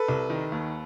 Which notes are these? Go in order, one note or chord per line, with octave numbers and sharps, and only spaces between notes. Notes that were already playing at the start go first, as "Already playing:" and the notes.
Already playing: A4 B4
C2
D#3
D#2